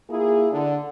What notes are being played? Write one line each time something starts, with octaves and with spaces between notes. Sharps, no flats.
A#3 E4 F4 G#4
D3